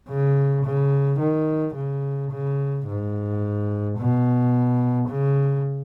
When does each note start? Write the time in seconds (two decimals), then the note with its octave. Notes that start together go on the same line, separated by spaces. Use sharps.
0.09 C#3
0.65 C#3
1.20 D#3
1.75 C#3
2.31 C#3
2.87 G#2
3.98 B2
5.09 C#3